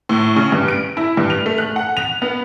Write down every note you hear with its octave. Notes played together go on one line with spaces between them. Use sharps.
A2
C#3
G2
D7
E4
G2
F7
A3
F#6
F#5
F7
B3